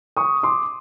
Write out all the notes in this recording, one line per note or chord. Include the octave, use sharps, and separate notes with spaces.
C#6 D#6
C6 D6